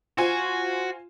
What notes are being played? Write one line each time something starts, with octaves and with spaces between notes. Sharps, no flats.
F4 F#4 C5 G#5